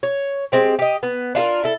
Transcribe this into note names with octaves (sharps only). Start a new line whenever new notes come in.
C#5
G#3 C4 G4
G4 D#5
B3
D4 F4 A4 A#4
E4 A4